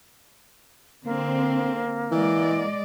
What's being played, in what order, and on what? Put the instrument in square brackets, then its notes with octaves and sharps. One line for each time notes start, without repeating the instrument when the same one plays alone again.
[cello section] D3 C4 [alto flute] A#3
[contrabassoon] E3 [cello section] G#3 D5 D#5